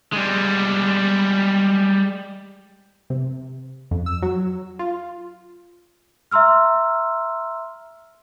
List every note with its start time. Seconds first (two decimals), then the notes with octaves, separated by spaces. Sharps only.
0.13 G3 G#3
3.10 C3
3.91 F2
4.06 E6
4.23 F#3
4.79 F4
6.31 E5 A#5 C6 E6 F6